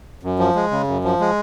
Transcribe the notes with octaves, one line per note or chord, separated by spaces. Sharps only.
F#2
F3
G#3
C#3
F#2
F3
G#3